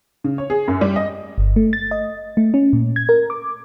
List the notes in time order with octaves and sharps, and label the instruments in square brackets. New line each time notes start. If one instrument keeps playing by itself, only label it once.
[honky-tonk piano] C#3
C#5
G#4
F#2
G3
D#5
[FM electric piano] G1
A3
A6
D#5
A3
C#4
A#2
G#6
A#4
D6